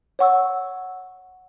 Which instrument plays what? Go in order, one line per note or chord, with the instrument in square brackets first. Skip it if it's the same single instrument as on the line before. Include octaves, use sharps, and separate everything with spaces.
[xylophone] C#5 F#5 C#6 E6